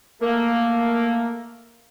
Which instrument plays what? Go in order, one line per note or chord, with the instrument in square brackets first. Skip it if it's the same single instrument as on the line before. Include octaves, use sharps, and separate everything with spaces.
[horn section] A3 A#3